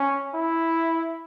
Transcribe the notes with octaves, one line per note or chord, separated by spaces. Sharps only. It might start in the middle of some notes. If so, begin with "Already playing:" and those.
Already playing: C#4
E4